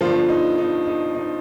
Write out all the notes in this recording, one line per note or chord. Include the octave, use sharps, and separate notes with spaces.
G1 G2 D3 F3 F4
D#4
D#4
D#4
D#4